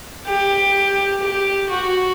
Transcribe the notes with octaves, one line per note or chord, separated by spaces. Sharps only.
G4
G4
F#4